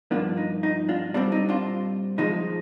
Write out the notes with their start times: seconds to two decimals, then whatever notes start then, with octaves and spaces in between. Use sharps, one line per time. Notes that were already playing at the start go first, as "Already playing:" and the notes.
0.11 G2 F3 A#3 D4 F4
0.37 D#4
0.63 D#4
0.89 D4 F4
1.14 A#2 G3 C4 D4
1.32 D#4
1.49 D4 F4
2.18 A#2 F3 G#3 D#4